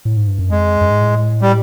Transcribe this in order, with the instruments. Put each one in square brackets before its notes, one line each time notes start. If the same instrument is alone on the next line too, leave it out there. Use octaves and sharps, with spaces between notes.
[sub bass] A2
G#2
G2
F#2
[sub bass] F2 [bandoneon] G#3
[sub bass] F#2
G#2
A2
[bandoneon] G3